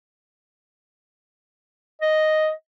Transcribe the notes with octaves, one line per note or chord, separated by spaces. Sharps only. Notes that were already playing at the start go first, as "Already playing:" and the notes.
D#5